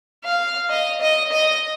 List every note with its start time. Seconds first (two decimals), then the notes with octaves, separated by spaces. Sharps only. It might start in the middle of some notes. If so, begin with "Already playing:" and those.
0.24 F5
0.70 D#5
1.01 D#5
1.32 D#5